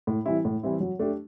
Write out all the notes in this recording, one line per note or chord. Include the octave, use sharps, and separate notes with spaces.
A2
E3 G3 C4 E4
A2
E3 G3 C4 E4
F#3
A3 D4 G4